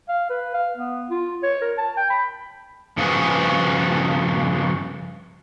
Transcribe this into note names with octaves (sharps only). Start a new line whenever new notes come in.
F5
B4
F5
B3
F4
C#5
A#4
A5
G5
B5
G2 C#3 F3 F#4 G#4 B4